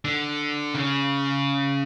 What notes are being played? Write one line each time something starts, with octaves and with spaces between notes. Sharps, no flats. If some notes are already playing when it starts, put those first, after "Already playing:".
D3
C#3